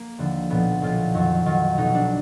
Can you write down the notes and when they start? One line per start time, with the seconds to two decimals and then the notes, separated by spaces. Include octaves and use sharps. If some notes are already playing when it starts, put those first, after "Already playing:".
Already playing: A#3
0.18 D#2 D3 F3
0.50 B1 A#2 F3 B3
0.82 B1 A#2 F3 F4
1.14 F2 D#3 F#3
1.45 F2 D#3 F#3 F4
1.78 B1 B2 F#3 D#4
1.94 D4